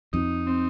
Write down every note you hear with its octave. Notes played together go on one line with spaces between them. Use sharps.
F2 D#4
C4